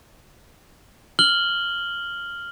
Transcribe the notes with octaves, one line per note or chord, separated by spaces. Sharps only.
F6 F#7 G7